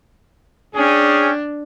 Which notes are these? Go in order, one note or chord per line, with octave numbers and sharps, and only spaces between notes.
C#4 D4 G#4 G5